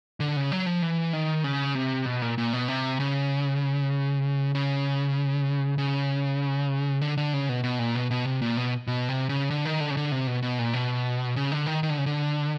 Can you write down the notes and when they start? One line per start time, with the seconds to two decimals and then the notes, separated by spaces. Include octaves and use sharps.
0.20 D3
0.36 C#3
0.52 F#3
0.66 F3
0.82 E3
1.13 D#3
1.44 C#3
1.75 C3
2.06 B2
2.22 A#2
2.38 A#2
2.53 B2
2.68 C3
3.00 C#3
4.55 C#3
5.78 C#3
7.01 D3
7.17 D3
7.34 C#3
7.49 B2
7.64 B2
7.79 A#2
7.95 B2
8.11 B2
8.25 C3
8.42 A#2
8.57 B2
8.87 B2
9.09 C3
9.29 C#3
9.50 D3
9.65 D#3
9.80 D3
9.90 C#3
9.97 D3
10.12 C3
10.27 B2
10.42 B2
10.59 A#2
10.73 B2
11.36 C#3
11.52 D3
11.66 D#3
11.83 D#3
11.90 D3
11.98 C#3
12.06 D3